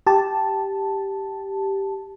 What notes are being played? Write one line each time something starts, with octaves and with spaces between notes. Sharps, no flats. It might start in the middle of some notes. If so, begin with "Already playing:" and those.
G4 A5